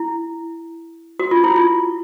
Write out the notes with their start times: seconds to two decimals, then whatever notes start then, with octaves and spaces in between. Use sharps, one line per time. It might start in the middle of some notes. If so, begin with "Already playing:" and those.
Already playing: E4
1.20 F#4
1.31 F4
1.44 E4
1.56 F4